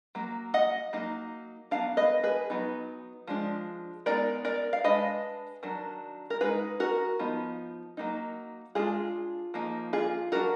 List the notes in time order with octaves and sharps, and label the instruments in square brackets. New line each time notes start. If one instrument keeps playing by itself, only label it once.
[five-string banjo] F#3 A#3
D#5 F#5
F#3 A#3 D#4
F#3 B3 D4 F5
B4 D#5
G#4 B4
F#3 B3 D#4
F3 G#3 D4
G#3 B3 D#4 A#4 D5
A#4 D5
F5
G#3 D4 B4 D#5
D#3 F#3 D4
A#4
G#3 D#4 G#4 B4
F#4 A#4
F3 B3 D#4
F#3 A#3 D#4
G#3 D4 F4 G#4
F3 A#3 D#4
F4 G#4
F#3 D4 F#4 A#4